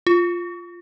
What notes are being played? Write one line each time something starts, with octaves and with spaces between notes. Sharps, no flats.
F4